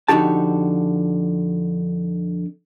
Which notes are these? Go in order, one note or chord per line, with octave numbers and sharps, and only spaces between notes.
F2 D3 D#4 F#4 G4 A5